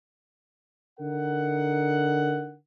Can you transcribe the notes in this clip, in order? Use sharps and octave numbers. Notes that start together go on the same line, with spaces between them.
D3 D#4 A#4 F#5